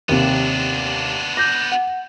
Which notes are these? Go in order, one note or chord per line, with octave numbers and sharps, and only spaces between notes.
D#2 C3 B3 D4
D6 G6 A#6
F#5